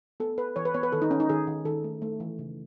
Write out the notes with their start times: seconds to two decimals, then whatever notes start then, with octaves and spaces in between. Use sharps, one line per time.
0.20 B3 A4
0.38 B3 B4
0.56 E3 C#5
0.65 B4
0.74 B3 C#5
0.83 B4
0.92 D#3 A4
1.02 D#4
1.11 D#3 C#4
1.20 D#4
1.29 D#3 G#4
1.47 D#3
1.65 D#3 A4
1.84 A3
2.02 A3
2.20 E3
2.39 C#3